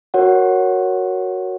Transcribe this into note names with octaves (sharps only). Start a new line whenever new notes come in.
F#4 A#4 C#5 F#5